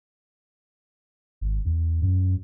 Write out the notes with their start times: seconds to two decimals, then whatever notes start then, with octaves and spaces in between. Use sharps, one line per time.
1.41 G#1
1.65 E2
2.02 F#2